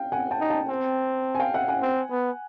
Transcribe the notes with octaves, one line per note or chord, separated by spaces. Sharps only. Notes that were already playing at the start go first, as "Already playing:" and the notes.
Already playing: F5 G5
F#5 G#5
G5 A5
D#4
G5 A5
C4
G#5
F5 G5
E5 F#5
F#5 G#5
C4
B3